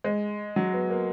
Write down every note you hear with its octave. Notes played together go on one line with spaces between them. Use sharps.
G#3
F#3
B3
A#3